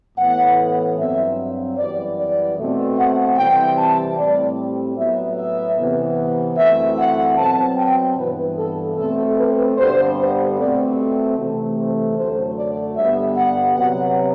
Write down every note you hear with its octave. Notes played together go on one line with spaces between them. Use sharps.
A2 E3 B3 F#5
G2 F#3 C4 E5
F#2 E3 G3 B3 D5
D5
B2 A3 C4
F#5
C3 E3 G3 C4 G5
A5
A2 G3 C4 D5
A2 F#3 B3 E5
E5
C3 E3 B3
F#2 E3 A3 C4 E5
F#5
B2 F#3 C4 A5
G5
G2 E3 B3 B4
A4
B2 A3 C4 A4
B4
G2 D3 G3 B3 C5
C5
B2 A3 C4 D5
C3 E3 A3
C5
F#2 D3 F#3 A3 C5
D5
G2 D3 G3 B3 E5
F#5
C3 F#3 B3 F#5